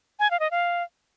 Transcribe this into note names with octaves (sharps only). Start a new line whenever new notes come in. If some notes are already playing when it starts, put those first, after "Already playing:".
G#5
F5
D#5
F5